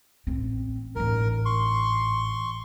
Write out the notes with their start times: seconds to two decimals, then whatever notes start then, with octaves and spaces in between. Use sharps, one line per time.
0.27 A1 C4
0.96 A1 G#2 A#4
1.45 C6 C#6